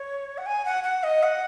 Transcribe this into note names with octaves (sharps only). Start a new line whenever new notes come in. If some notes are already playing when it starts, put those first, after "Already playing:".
Already playing: C#5
F#5
G#5
F#5
F#5
D#5
F#5